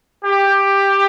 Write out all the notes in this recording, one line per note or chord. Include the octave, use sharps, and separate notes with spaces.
G4